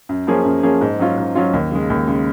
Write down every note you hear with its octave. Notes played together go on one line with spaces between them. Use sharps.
F#2
F3 A#3 C#4 G#4
F#2
F3 A#3 C#4 G#4
G#2
F#3 C#4 F4
G#2
F#3 C#4 F4
D#2
C#3 G#3
D#2
C#3 G#3